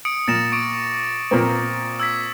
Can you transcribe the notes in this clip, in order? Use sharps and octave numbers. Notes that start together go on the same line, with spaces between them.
D#6 C#7 D7
A#2 A6 A#6 E7
C#6 D6 D7
A#2 A#3 C4
E6 G#6 B6